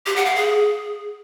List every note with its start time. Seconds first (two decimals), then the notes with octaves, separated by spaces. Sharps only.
0.06 G4
0.16 F#5
0.26 F5
0.35 G#4